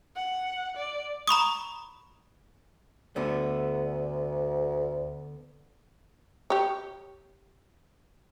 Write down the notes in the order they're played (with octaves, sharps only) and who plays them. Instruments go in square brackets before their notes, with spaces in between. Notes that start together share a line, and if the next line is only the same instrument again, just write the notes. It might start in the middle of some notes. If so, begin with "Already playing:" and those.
[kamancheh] F#5
D5
[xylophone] A#5 B5 C#6 D#6
[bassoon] D2 [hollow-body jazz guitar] D3 A3 B3
[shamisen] G4 C#5